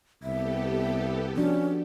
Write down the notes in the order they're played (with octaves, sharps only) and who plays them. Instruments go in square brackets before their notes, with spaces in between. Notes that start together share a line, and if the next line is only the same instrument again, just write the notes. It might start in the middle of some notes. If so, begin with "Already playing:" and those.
[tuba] C2 [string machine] B3 G4 A4 [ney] E5
[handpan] F3 D4 F#4 [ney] C#4